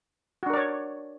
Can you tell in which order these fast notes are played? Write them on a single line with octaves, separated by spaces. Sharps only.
F#4 D4 A#4 D5 C#5